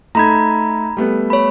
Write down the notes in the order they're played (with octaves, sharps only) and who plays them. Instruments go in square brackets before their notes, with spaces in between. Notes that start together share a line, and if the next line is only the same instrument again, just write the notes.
[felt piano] A3 D#4 [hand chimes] A#5 B5 G#6
[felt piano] G3 A3 B3
[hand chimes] C#5 B5